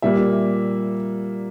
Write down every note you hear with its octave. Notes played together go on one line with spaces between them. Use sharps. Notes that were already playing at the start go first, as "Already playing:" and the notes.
A#2 G3 A#3 E5